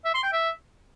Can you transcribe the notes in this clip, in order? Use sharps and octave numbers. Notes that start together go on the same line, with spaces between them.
E5
C6
G5
E5